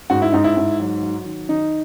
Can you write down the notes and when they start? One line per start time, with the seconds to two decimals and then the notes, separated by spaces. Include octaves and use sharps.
0.10 G#2 F#4
0.22 E4
0.32 G#2 D#4
0.44 E4
0.57 G#2
0.80 F#3
1.03 F#3
1.25 D#3
1.49 D#3 D#4